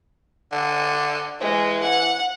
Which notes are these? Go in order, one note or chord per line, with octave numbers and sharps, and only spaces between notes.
D3
E3 G#3
F#5